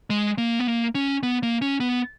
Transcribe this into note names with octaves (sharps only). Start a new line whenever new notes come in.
G#3
A#3
B3
A#3
C#4
B3
A#3
C#4
B3